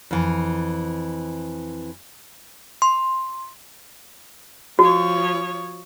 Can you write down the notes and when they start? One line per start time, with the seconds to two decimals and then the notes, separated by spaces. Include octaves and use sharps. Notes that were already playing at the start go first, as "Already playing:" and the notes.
0.11 F2 E3
2.82 C6
4.79 F3 F#4 C#5